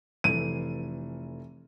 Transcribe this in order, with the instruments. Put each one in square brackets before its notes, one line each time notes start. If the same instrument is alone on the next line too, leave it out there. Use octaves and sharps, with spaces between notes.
[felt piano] F1 E3 A4 [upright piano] D#7